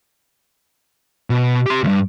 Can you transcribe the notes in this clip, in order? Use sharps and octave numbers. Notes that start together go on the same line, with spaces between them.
B2
G4 C6
D2 G2